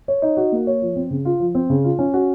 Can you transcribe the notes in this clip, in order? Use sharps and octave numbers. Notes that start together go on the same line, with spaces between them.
C#5
D#4
F#4
A#3
C#5
F3
C4
C#3
F4
F3
C4
C#3
F4
C#4
F#4